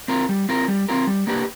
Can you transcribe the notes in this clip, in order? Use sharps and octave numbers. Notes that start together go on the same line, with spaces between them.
C4 F4 A#4
G3
C4 F4 A#4
G3
C4 F4 A#4
G3
A#3 D4 G4 B4